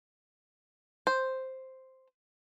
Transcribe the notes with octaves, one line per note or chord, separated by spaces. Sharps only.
C5